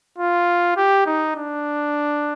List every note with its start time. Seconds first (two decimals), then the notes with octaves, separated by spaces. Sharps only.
0.18 F4
0.77 G4
1.06 D#4
1.36 D4